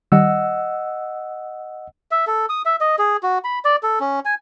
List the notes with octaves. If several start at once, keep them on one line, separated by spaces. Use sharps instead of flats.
D#3 G3 D#5 F#5 E6
E5
A4
D#6
E5
D#5
G#4
F#4
B5
D5
A4
C#4
G#5